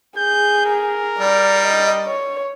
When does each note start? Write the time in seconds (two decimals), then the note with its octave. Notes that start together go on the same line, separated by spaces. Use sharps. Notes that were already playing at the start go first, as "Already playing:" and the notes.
0.17 G#4 G6
0.66 A#4
1.18 G3 D5
1.66 D#5
2.06 C#5